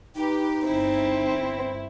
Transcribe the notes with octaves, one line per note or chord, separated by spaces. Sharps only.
D#4 G4 B4
G1 C4 E4